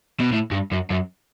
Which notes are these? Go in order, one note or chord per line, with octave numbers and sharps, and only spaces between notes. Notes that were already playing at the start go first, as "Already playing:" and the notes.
B2
A2
G2
F#2
F#2